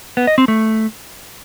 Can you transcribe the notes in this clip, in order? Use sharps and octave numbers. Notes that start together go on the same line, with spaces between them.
B3
D#5
C4
A3